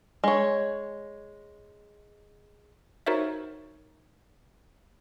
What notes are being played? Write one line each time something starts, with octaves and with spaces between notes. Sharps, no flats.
G#3 C#5
D#4 F#4 A#4 C5 C#5 E5